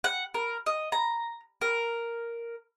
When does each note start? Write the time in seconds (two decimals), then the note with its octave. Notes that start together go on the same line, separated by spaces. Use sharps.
0.04 F#5
0.34 A#4
0.66 D#5
0.92 A#5
1.61 A#4